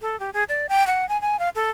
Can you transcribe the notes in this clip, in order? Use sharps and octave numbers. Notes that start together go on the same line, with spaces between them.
A4
G4
G#4
D5
G5
F#5
G#5
G#5
F5
A4